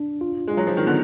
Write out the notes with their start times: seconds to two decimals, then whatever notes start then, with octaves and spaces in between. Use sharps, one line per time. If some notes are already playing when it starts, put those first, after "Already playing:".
Already playing: D4
0.21 F4
0.47 G#3
0.54 F#3 F4
0.67 F3
0.77 D#3
0.86 D3 B3